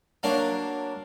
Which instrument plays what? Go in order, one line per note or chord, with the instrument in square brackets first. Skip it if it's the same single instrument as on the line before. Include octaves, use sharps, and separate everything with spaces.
[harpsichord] F#3 A#3 D4